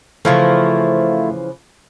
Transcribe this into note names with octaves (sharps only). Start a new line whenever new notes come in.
C#3 E3 F3 A3 E4 F4